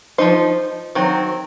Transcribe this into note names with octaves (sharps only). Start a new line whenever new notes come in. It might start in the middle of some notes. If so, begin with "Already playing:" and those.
F3 C4 D#4 C5
D#3 F#3 C4